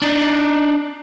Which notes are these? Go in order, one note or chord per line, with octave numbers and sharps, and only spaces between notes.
D4 D#4